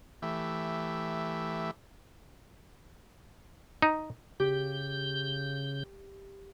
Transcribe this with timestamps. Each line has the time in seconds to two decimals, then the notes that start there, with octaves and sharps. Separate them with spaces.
0.22 E3 A3 G4 E5
3.82 D#4
4.40 C#3 G4 G6